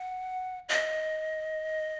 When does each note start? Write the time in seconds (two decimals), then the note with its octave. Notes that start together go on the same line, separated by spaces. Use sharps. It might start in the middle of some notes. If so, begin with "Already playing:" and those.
Already playing: F#5
0.69 D#5